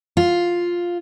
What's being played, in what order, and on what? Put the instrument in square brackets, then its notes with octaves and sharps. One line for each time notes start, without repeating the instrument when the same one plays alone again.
[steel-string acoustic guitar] F4